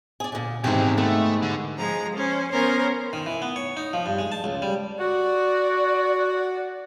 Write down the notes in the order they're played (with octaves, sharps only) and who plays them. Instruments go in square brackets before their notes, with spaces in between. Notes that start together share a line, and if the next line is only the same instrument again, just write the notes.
[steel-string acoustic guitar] G#4 D5
A#2 D3
[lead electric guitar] E2 C3 [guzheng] G#2 G#4 [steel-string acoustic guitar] D#3 E4 G4
[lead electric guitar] A3 [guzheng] B3
[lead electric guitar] D3
[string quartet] F3 G#3 A#5
C#4 C5
B3 C#4 A#4 C5
[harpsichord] D#3
E3
B3
C#5
D#4
F3
G2
G#3
A5
C#2
G3
[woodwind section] F#4 [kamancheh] D5